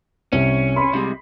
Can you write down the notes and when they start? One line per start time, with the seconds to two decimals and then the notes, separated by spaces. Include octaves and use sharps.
0.32 C2 C#4
0.76 B5 C6
0.93 C3 G3 G#3